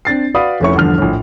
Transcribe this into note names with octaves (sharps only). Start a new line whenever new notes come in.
C4 D4 A6 C7
F#4 B4 D5 F5 B5 D#6
F1 F2 A3 C#4 E4 C#6
E2 G2 D3 F3 F6
A#1 A2